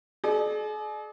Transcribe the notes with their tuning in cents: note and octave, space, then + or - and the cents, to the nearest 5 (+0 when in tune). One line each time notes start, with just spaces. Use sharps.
G#4 +45 D5 +35